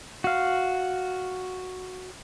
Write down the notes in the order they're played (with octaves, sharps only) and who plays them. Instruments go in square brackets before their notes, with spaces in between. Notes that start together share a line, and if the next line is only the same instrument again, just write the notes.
[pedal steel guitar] F#4 F5